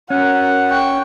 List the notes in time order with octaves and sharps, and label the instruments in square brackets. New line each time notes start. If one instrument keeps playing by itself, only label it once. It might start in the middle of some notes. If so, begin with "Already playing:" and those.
[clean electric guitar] C#4 [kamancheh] F#4 A#4 [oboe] F#5
[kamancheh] G5 C#6